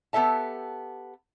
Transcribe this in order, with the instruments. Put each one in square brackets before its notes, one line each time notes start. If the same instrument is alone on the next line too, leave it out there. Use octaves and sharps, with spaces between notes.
[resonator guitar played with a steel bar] B3 G4 A4 E5 A5